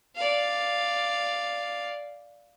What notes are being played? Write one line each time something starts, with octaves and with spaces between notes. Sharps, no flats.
D5 F5